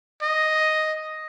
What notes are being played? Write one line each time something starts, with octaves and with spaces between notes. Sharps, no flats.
D#5